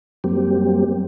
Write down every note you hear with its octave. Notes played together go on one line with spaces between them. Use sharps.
F#2 F#3 G3 A#3 C4 G4